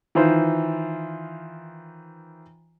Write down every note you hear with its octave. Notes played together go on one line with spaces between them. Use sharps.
D#3 E3 F4 C5